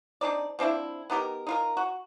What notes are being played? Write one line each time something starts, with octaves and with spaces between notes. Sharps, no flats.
C4 D4 D#4 D5
F3 C4 D4 E4
B3 D#4 G4 A#4
D#4 F4 A#4
F#4